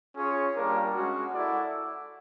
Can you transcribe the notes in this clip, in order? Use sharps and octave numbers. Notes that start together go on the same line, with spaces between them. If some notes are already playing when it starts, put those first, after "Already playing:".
C#4 F4 G#4 C#5
G3 A#3 D4 F4 A#4
G#3 C#4 F#4
E4 A4 D5 F#5